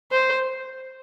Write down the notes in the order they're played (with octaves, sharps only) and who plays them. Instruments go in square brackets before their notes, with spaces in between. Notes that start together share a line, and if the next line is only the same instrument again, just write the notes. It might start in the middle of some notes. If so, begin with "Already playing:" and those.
[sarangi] C5